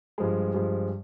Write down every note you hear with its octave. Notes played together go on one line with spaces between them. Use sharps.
G2 F3 G#3
G2 F3 G#3